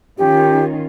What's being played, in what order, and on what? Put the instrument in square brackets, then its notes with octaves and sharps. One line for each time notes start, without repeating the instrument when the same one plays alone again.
[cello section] D#3 C#4 F4 [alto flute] G4